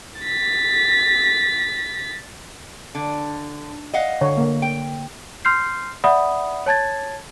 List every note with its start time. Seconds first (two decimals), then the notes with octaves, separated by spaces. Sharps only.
0.22 A6 B6
2.95 D3
3.94 D#5 F5 F#5
4.21 D3 C#5
4.37 D3 A#3
4.62 G5
5.45 C6 F6 G6 C7
6.04 D5 E5 F#5 B5 D#6
6.66 C#5 A5 G#6 A6